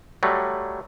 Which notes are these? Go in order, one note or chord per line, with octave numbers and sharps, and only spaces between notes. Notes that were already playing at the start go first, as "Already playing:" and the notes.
F#3 G3 A3